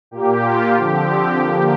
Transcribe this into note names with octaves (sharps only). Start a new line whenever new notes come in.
A#2 A#3 G4
F4
D3 F3 C4 G4
G4
D3 F3 A#3 G4